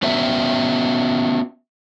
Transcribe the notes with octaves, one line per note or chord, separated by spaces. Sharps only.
B3 C#4 F#4 B4 D5 E5